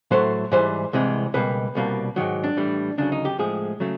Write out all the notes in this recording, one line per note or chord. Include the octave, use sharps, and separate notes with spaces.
A2 F#3 A3 C5
G#2 E3 G3 C5
C2 C3 E3 G#3
C#2 B2 G3 A#3 B4
C2 B2 G3 A#3
G#2 D#3 F#3
D4
A2 E3 G3
D2 C#3 F#3 D4
D#4
G4
A2 F3 G#3 G#4
C#3 F#3 A3